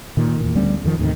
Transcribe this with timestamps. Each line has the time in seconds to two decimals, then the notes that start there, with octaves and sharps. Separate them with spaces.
0.17 A#2 D#3
0.40 E2 A#2
0.55 D2 G3 B3 C#4
0.84 F2 D#3 F3
0.99 D#2 A2 C3 D#3